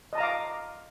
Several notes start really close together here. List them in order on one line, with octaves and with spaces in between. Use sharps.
D#5 A5 A#5 F5 D6